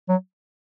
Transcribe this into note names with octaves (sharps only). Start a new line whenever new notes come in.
F#3